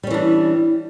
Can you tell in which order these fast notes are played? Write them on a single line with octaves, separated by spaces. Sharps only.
G3 C#4 E3 D4